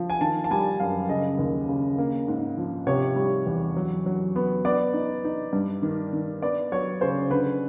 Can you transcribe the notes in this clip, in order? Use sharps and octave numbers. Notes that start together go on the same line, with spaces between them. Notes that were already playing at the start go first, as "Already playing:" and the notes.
Already playing: F3
G#5
D#3 A5
A5
G3 G#5
F#2 F5
C#3 D#5
D#2
C#3
A#3
G#2
F3
C3 C#5
G3
E2
F#3
F#3
B3
B3 D5
D#4
D#4
G2
D#3
D#3
B3 D5
F#3 C#5
C#3 C5
D3 B4